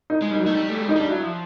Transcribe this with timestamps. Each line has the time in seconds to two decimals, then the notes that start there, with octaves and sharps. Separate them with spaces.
0.10 D#4
0.22 G#3
0.31 G3 D#4
0.39 F#3
0.44 A3 D#4
0.55 G3
0.70 A3
0.82 G#3
0.89 D#4
0.96 G3 D4
1.08 F#3 E4
1.23 F3